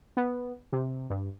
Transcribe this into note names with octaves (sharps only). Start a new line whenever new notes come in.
B3
C3
G2